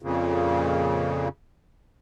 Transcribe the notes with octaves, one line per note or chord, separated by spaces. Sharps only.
F2 A#2 C#3